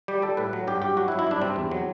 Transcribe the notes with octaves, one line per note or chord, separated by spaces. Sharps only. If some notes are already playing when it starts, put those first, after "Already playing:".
G3 G4
G3 A4
A2 B4
F#3
G2 G4
G2 G4
F#3 F#4
E4
F#3
E4
G2 D4
C3 C4
E2
F#3